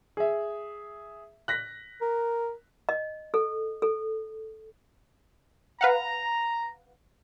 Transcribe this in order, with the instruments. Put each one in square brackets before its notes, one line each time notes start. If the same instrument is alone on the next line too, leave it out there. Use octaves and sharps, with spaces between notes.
[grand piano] G#4 E5
F#6 A#6 B6
[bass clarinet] A#4
[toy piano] D#5
A4
A4
[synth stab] B4 F5 F#5 [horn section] A#5